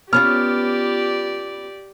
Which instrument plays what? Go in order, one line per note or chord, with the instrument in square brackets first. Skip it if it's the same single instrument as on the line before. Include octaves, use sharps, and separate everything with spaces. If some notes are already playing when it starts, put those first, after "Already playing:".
[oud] B3 C#4 F4 [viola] G4 D5 [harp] F6